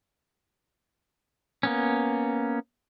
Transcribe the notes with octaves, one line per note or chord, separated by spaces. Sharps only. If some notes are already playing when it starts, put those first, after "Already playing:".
A#3 B3 C#4